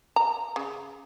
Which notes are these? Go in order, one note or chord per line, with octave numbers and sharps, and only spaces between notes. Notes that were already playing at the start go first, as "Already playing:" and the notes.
A#5
C#3